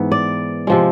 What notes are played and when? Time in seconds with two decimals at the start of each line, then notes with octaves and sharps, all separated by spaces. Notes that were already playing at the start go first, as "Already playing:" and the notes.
Already playing: G#2 E3 B3
0.12 D5
0.67 C3 F3 G#3